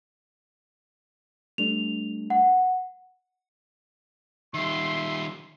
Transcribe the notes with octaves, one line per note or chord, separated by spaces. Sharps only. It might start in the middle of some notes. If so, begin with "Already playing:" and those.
G3 A3 D4 F7
F#5
D#3 G3 E5 C6